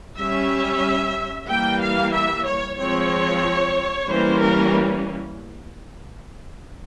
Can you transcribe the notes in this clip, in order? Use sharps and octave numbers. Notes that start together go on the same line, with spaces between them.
G3 C#4 E5
E3 G3 A#3 G5
F5
E5
C#5
F3 G#3 C4 C#5
E3 G3 A#3 C#4 C5
A#4